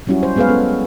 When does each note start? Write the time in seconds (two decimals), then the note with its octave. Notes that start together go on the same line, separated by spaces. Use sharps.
0.07 F#3 G3 C#4 E4 F#4
0.23 C5
0.36 G#3 B3 G#4 B4 C#5 F5
0.49 B3 C#4 A4